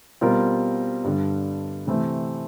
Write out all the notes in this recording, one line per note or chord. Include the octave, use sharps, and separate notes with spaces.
B2 G3 C4 F4 A#4
G2 D3 G3
C3 E3 A3 C4 E4